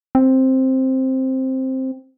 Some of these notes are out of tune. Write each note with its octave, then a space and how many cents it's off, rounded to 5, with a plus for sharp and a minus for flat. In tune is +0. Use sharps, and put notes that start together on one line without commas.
C4 +5